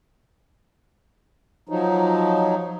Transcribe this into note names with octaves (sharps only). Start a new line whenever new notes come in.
F3 F#3 D#4